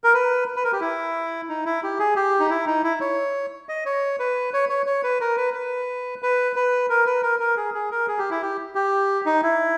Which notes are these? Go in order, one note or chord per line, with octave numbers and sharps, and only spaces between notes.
A#4
B4
B4
A#4
G4
E4
D#4
E4
G4
G#4
G4
D#4
E4
D#4
E4
C#5
D#5
C#5
B4
C#5
C#5
C#5
B4
A#4
B4
B4
B4
B4
A#4
B4
A#4
A#4
G#4
G#4
A#4
G#4
G4
E4
G4
G4
D#4
E4